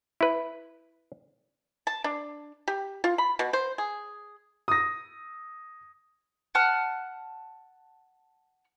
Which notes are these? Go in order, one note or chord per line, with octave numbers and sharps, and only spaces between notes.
E4 B4
A5
D4
G4
F4
B5
B2
C5
G#4
D#6 A#6
F#5 A5 F6 F#6